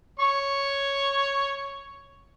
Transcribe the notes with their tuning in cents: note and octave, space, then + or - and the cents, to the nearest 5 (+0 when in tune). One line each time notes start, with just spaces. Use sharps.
C#5 +0 C#6 +0